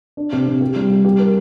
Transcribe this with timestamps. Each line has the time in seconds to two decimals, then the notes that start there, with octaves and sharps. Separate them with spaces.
0.17 D4
0.32 C3
0.47 C3
0.61 G4
0.76 G3
0.90 G3
1.05 G4
1.19 A#4